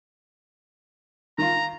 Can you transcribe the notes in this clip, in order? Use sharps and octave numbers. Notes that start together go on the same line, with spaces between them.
D#3 F4 A#5